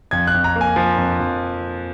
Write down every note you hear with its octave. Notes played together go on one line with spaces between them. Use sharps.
F2 G#6
F#6
F2
A#5
A#3
G#5
F3
F2
F2